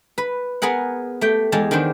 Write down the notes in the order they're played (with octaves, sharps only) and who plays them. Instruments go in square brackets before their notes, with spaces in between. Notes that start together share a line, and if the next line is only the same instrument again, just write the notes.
[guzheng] B4
B3 G#4 A#4 F#5
A3 G4 G5
E2 G#3 G4 F5 A5
D#3 G#3 B3 D4 C5